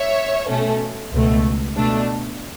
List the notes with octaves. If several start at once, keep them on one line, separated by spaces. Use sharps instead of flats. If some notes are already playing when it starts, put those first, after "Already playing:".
Already playing: C#5 E5
B2 A3 C#4
C#2 B2 A3
B2 A3 D4